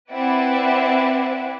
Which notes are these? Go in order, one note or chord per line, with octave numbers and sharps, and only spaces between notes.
C4 E4 B4 D5 E5 F#5